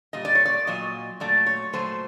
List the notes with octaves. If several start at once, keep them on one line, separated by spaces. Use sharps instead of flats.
A#2 G3 D#5
D5
C#5
D5
A#2 F#3 D#5
A#2 F#3 A3 D5
C#5
A#2 F#3 A3 C5